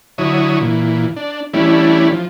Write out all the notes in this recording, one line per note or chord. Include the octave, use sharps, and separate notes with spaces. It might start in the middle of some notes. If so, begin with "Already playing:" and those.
D3 F#3 E4 C#5 D#6
A#2 E3
D4
E3 G3 A3 C#4 D4 E4
F3